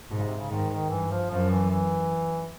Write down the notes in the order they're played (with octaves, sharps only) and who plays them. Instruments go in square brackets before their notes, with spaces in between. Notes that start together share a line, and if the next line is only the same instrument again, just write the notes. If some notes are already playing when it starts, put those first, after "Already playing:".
[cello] G#2 [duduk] B2
[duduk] C#3
C3
C#3
[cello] G#2 [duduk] D#3
[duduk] D#3
[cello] G2 [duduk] E3
[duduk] F3
[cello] F#2 [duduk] F3
[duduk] E3
E3